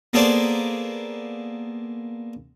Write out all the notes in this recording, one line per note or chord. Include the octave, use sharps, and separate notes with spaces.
A#3 B3 G#4 A4 C5 D5